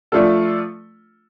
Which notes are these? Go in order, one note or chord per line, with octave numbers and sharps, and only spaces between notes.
F3 A3 D4 F4 A4